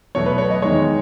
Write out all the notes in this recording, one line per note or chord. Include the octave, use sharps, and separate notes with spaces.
E2 B2 F#3 A3 C#5
B4
C#5
D#5
E2 D#3 G#3 C#5